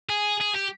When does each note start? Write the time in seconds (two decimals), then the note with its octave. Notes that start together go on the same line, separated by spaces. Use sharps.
0.09 G#4
0.40 G#4
0.55 G4